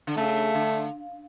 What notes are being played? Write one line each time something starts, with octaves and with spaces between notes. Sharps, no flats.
D3
C#3 A3
D3